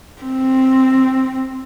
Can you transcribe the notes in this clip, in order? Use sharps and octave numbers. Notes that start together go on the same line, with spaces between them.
C4